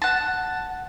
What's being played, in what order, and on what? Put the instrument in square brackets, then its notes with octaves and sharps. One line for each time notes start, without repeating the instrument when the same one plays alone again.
[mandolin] F#5 A5